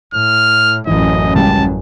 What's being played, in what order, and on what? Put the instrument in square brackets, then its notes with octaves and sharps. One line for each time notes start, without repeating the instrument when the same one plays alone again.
[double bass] A2 [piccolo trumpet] F6
[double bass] A1 F#2 [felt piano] E3 [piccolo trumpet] D#5
[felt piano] C#2 G3 [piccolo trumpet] A5